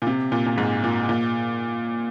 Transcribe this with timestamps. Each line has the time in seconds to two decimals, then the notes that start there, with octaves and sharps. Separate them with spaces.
0.02 A#2
0.07 C3
0.32 A#2
0.46 A#2
0.58 G#2
0.84 A#2
1.09 A#2